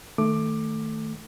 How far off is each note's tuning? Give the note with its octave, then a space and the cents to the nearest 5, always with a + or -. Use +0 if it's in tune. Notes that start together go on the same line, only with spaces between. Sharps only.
D#3 +0 A3 +0 D6 +15